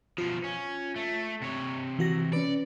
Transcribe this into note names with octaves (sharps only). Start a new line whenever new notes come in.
B2 F3 F4
C#4
A3
C3 C#5
E3 F#4 A#6
C#4 B4 D5